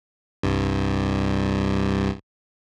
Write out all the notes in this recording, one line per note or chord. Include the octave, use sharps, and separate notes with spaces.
C2 G2